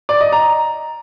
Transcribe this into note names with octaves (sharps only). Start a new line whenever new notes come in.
D5
D#5
A#5